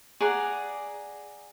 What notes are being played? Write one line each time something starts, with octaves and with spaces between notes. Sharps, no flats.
G#4 D5 F#5 A#5